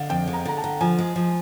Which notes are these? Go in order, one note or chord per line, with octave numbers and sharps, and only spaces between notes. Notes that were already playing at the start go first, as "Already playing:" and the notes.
Already playing: D3 D#5 F5
F2 G5
G#3
A#5
D3 A#5
A5
D3
F3 G#5
G#3
F3